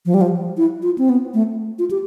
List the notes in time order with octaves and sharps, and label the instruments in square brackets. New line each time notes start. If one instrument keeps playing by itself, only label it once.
[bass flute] F3
G3
F3
E4
F4
C4
B3
A3
F4
G4